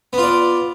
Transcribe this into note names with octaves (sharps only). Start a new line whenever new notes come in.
B3 F4 D5